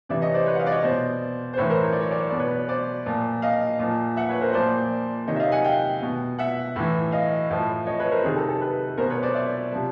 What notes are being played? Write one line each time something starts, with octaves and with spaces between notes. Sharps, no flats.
C3 E3 D5 E5
C#5 D#5
C5 D5
B4 C#5
F#5
D#5 F5
D5
C#5 D#5
B2 C5 D5
C5
A2 E3 B4 C#5
A#4 C5
C#5
D5
C#5
D5
C#5
B2 D5
B4 C#5
C5 D5
A#2 F3
D#5 F5
A#2 F3
E5 F#5
B4 C#5
A#4 C5
A#2 F3 C5 D5
C3 D#3 C#5 D#5
E5
D#5 F5
F#5 G#5
F5 G5
B2
E5 F#5
A2 E3
D#5 F5
A2 F3
C#5 D#5
B4 C#5
A#4 C5
C3 D#3 G#4 A#4
A4
A4
A4 B4
B2 A#4 C5
B4 C#5
C5 D5
D5 E5
C3 F3